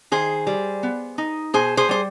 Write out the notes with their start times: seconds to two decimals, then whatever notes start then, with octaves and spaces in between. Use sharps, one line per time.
0.11 D#3 G#4 C5
0.47 G3
0.83 B3
1.18 D#4
1.54 B2 G#4 C5
1.77 G#4 C5
1.89 G3 C5